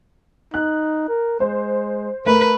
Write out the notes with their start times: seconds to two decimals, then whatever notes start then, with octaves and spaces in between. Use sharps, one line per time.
0.54 D#4 F#6
1.08 A#4
1.40 G#3 C5
2.26 A3 A#4 B4